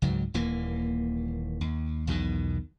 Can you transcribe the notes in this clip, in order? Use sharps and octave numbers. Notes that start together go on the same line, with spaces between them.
C#2 G#2 F#3
D#1 D#2 E3 A#3
D#2
B1 E2 B2 D#3